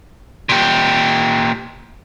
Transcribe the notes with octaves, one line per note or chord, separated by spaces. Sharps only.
A#2 G4